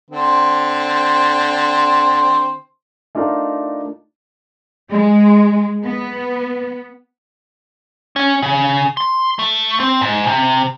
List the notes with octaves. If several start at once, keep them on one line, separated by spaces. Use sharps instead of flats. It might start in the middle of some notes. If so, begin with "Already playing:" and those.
D3 C4 C5
A3 D4 D#4 F4 A#4
G#3
B3
C#4
C#3
C6
A3
C4
G#2
C3